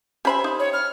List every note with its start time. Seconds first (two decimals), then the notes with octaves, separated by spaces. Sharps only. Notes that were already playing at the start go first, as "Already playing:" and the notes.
0.25 C#4 G4 C5 E5 B5
0.44 D#4
0.59 C#5
0.73 F6